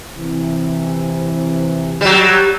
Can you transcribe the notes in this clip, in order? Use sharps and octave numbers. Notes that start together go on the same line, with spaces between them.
C3 E3
F#3 G3